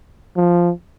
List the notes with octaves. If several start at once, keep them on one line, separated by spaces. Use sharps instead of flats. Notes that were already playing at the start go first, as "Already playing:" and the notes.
F3